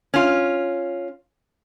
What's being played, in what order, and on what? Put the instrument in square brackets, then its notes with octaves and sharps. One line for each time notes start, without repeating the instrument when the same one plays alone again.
[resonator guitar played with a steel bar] C#4 F4